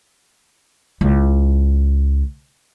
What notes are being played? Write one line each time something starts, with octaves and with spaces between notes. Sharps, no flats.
C#2 E4